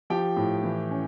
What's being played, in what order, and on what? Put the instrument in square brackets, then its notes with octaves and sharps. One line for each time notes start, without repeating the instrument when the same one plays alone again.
[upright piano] F3 G4 G5
A2
E3
C#4